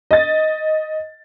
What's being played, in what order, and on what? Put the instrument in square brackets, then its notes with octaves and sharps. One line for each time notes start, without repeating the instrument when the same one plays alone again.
[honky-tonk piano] D#5 A6